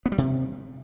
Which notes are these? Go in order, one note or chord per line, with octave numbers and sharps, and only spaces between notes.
B3
G3
C3